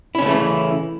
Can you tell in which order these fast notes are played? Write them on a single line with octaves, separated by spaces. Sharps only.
E4 C#4 C#3 A3 E3